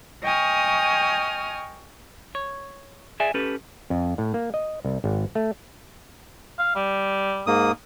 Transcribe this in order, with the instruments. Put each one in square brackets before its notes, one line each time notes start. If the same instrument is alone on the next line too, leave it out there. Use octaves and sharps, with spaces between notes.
[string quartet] D#5 G5 G#5 C#6 D#6 F6
[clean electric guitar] C#5
G#4 D5 E5 G#5
C#4 G4 A4 B4
[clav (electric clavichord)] F2
A2
A#3
D#5
C2
G#1
A3
[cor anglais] F5
G3
[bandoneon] G#2 A#3 D#6